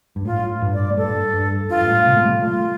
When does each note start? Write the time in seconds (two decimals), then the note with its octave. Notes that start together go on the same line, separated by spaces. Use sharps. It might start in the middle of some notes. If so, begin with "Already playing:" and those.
0.16 G2
0.25 A2 F4
0.62 G2
0.73 D5
0.90 A2
0.97 G2 A4
1.34 G2
1.70 G2 F4
1.81 G2
1.88 A2
2.06 C3
2.16 A3
2.24 G3
2.42 A3 F4